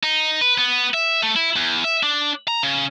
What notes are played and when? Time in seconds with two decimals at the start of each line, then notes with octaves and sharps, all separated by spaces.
0.03 D#4
0.41 B4
0.58 B3
0.94 E5
1.23 A3
1.36 E4
1.56 E2
1.84 E5
2.03 D4
2.48 A#5
2.63 C#3